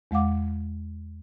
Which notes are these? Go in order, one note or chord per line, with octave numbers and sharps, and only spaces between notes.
E2 G#3 F5 F#5 D6